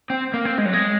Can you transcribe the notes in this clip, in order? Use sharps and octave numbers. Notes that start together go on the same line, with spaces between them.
C4
A#3
C4
G#3
F#3
G#3